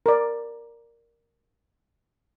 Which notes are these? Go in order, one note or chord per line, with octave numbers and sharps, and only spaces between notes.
A#4 D5